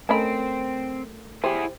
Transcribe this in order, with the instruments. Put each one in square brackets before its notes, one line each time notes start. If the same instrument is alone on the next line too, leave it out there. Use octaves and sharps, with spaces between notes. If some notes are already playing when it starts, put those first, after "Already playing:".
[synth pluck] A3 A4 A#4 [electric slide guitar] C4 [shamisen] C#4 D#5 B5
[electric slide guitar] E4 G#4 [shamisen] G4 C5